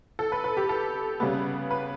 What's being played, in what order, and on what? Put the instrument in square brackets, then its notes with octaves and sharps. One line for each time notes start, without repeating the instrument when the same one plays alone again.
[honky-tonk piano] A4
B4
B4
G4
A4
C#3 G3 B3
B4